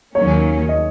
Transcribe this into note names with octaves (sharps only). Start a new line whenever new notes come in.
D#2 D#3 F#3 A#3 C#4 C#5
D#5